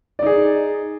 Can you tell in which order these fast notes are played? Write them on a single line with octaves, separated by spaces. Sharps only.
D5 D#4 G#4